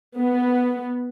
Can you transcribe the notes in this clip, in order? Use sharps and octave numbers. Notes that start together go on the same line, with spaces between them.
B3